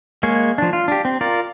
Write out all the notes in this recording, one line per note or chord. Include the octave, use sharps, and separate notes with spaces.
G#3 A#3 G#4 C#5
F3 D4
F4
D4 G4
C4
F4 A#4 D5